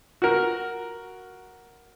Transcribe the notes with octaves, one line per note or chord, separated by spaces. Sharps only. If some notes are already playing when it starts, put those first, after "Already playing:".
F#4 A#4